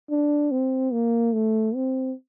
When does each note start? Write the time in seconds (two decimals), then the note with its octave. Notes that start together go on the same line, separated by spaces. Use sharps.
0.10 D4
0.51 C4
0.93 A#3
1.33 A3
1.75 C4